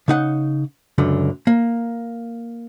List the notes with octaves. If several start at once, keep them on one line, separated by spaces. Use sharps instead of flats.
C#3 D#4 F#5
C#2 F#2 D3
A#3